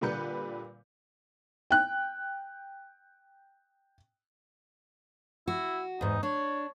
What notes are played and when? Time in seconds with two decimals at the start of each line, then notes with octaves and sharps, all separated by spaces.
0.01 A#2 D3 G3 B4 G6 C#7
1.71 G5 F#6
5.48 E4 F#4
6.01 E2 G#2 D#4
6.23 D4 C#5